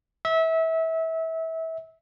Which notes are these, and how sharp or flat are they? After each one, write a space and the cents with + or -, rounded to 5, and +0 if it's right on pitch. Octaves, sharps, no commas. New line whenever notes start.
E5 -25